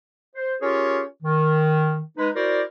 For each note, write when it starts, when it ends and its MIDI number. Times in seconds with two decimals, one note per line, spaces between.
0.35 0.55 72
0.61 1.02 61
0.61 1.02 65
0.61 1.02 67
0.61 1.02 68
0.61 1.02 70
0.61 1.02 73
1.23 2.01 51
2.17 2.29 56
2.17 2.29 63
2.17 2.29 71
2.35 2.62 64
2.35 2.62 66
2.35 2.62 70
2.35 2.62 72
2.35 2.62 74